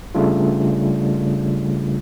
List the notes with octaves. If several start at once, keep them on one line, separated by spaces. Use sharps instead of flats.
C#3 G3 A3 D4 F4